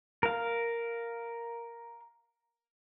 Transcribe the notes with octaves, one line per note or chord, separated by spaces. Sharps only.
A#4 F5